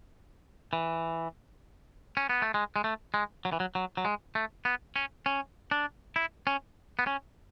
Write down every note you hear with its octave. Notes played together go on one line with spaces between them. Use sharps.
E3
C#4
B3
A3
G#3
G#3
A3
G#3
F#3
E3
F#3
F#3
F#3
G#3
A3
B3
C#4
C#4
D4
E4
C#4
B3
C#4